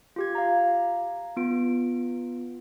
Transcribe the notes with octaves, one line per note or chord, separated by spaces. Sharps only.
F4 G4 G#6
F5 A#5
B3 F4 D7